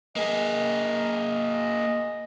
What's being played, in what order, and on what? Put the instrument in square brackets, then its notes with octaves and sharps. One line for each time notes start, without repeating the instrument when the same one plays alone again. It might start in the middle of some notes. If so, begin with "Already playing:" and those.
[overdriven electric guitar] A#3 G#4 [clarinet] D#5